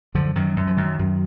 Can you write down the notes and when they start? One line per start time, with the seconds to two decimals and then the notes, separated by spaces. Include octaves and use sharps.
0.15 F#2 D3 F3
0.35 F#2 D#3 F#3
0.56 F#2 F#3
0.67 F3
0.76 F#2 D#3 F#3
0.99 F#2